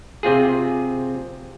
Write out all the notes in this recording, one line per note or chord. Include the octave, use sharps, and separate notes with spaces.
C3 C4 F4 G#4